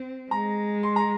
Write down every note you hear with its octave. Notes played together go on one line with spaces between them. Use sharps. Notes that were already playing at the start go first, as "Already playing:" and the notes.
Already playing: C4
G#3 A#5
C6
A#5